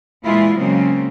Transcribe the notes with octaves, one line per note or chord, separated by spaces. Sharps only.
A#2 E3 G#3 E4 F4
C#3 F#3 G#3 A#3 C4